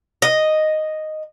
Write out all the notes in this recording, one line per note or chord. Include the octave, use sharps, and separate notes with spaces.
D#5